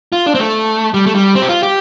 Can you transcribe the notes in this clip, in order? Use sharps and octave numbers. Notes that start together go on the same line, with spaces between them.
F4
D4
C4
A3
G3
A3
G3
C4
G4
F4
G4